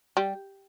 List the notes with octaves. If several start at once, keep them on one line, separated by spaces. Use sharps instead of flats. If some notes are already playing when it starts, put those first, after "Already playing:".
G3